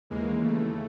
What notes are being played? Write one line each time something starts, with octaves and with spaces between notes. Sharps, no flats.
D#2 C#3 E3 G#3 A#3
A3